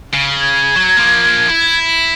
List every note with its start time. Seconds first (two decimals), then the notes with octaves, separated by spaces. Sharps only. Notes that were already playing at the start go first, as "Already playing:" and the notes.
0.14 C#3
0.40 G#6
0.76 F#3
0.97 F3 A#3
1.49 E4